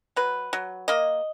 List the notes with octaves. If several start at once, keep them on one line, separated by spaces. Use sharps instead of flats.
F#3 B4
F#3
A#3 D#5